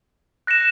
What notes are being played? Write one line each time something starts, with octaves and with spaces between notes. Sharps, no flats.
F#6 A#6 C#7 E7